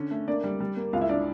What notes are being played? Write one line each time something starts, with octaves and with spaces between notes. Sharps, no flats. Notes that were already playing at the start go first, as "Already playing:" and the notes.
Already playing: D3 C#4
A3
A#3 D4 D5
G3
G3
A#3
C#2 F4 F5
E4 E5
D4 D5